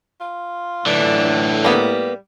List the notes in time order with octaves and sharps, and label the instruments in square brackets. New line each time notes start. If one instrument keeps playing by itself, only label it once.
[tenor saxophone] F4
[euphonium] A2 [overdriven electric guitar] D3 E3 [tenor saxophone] D4
[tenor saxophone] G3 [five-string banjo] A#3 B3